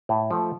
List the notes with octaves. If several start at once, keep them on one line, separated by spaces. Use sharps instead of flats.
A2
F3 A3